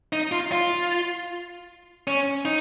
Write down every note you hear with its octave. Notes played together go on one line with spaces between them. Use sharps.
D#4
F4
F4
C#4
D#4